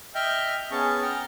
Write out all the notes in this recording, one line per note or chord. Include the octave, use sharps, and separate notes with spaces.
D#5 E5 G5 F6 G6
B3 C#4 G#4 A5 C#6
G5 A#5 F6